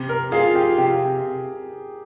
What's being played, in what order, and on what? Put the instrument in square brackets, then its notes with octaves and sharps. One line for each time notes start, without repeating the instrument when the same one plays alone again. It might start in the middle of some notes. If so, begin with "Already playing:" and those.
Already playing: [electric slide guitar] C3
[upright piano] A#4
[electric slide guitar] F4 [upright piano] G#4
[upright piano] G4
[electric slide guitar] C3 [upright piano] G4